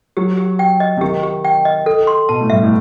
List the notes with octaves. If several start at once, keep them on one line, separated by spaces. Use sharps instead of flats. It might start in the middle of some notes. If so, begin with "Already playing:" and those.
F#3 G4
G4
G5
D#5
C3
D#3 G4
G4
G5
D#5
A4
C6
B2 A5
A2
G2 E5
A2